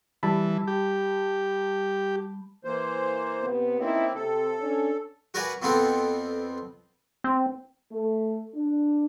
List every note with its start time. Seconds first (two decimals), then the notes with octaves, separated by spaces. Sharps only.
0.23 E3 G3 A5 B5
0.67 G4
2.65 E3 A#3 C5
3.41 C3 B3
3.78 A#3 C4 C#4 D#4 E4
4.14 C3 A4
4.60 C#4 D4
5.34 F#4 A#4 B4 D5 F#5 G#5
5.62 F2 F3 B3 C4 A4 F#5
7.24 C4
7.91 A3
8.54 D4